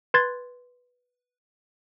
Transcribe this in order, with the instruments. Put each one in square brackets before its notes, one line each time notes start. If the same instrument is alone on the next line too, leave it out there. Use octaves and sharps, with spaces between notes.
[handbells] B4 C6 G#6 A6